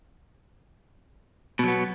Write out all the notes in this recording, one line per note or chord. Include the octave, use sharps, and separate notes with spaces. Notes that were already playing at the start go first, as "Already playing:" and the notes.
B2 F#3 B3